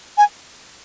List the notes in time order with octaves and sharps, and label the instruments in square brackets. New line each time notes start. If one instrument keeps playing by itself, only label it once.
[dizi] G#5